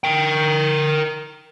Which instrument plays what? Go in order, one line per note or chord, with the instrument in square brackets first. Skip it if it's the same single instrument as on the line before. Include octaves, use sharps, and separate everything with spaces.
[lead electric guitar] A#4 G5